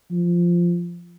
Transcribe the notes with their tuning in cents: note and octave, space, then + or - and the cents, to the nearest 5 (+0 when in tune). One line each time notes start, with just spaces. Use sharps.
F3 -10